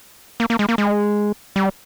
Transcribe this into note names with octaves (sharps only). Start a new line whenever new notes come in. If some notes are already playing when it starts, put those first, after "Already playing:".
A#3
A#3
G#3
A#3
G#3
G3